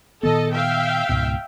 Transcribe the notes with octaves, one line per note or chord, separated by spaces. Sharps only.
A#2 D#3 B3 A4 D#5 A5
E5 F5 G5
C#2 G#2 B2